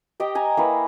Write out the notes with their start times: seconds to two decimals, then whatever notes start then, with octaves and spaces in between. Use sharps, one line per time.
0.20 G4 D#5 G5
0.35 G#5 A#5
0.57 A#3 E4 B4